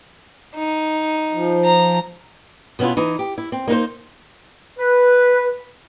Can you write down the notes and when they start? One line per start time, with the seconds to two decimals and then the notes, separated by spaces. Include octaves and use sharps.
0.56 D#4
1.33 F3
1.65 A#5
2.79 B2 B3 C#4 E4 F4
2.97 E3 D#4
3.19 G4
3.38 E4
3.52 C4
3.68 A#3 D#4 B4 C5
4.78 B4